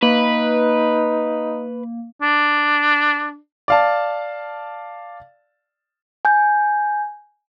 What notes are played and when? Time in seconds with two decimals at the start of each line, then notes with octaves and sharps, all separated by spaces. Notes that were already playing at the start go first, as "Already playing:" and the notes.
0.03 A#3 D#4 B4
2.22 D4
3.68 D5 F5 A5
6.25 G#5 G6